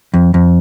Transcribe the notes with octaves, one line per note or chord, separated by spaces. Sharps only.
F2
F2